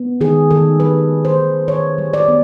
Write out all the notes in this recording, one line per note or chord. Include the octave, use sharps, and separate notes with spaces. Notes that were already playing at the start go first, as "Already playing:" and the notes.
Already playing: B3
D#3 G#4
D#3 A4
G3 B4
B3
C5
D#3
D#3 C#5
G3
D5
B3